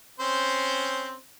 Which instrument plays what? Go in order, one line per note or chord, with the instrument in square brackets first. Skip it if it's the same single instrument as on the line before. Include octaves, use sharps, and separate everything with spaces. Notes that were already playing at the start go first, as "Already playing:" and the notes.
[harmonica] C4 C#4 C5